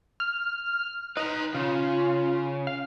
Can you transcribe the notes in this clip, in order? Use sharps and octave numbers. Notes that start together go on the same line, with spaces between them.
F6
D#4 B4 A#5
C#3 F4
F5